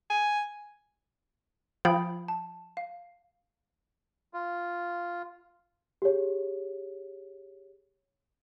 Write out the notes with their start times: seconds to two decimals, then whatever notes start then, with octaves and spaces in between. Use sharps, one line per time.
0.10 G#5
1.85 F3 G5 B5 D#6
2.28 A5
2.77 F5
4.34 F4
6.02 G4 G#4 C#5